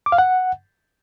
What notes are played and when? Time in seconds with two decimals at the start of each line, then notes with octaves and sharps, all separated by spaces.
0.06 D6
0.12 F5
0.18 F#5